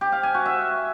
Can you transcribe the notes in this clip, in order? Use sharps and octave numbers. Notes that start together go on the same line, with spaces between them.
G4
F5
G#5
F#4
E5